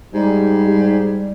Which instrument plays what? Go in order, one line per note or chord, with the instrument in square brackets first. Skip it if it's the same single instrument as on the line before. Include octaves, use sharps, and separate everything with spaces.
[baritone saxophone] G#2 [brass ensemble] G3
[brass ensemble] G3